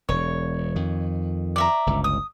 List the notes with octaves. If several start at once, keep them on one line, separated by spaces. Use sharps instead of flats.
E1 C#5
F2 D#3
D5 E5 A#5
G1 C#2
D#6